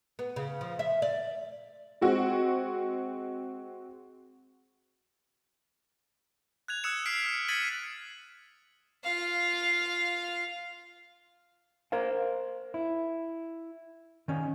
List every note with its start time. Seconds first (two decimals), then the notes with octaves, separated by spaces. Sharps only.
0.19 B3
0.36 C#3
0.61 F3
0.79 E5
1.02 D5
2.01 G#3 C4 F#4
6.68 F#6 G#6 F7
6.84 D#6 E6 F#6 G#6 C#7 E7
7.06 F6 B6 C7 D7
7.26 F6
7.48 G#6 A6 B6 C#7 D#7 F#7
9.04 F4 F5
11.92 A#4 C5 F5
12.74 E4
14.28 D#3 C#4